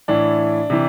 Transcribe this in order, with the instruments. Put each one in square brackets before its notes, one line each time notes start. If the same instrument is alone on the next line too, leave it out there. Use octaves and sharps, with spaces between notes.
[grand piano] A2 E3 D4
C3 E3